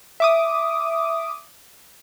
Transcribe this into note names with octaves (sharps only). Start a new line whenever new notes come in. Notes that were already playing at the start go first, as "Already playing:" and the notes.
E5 D6 D#6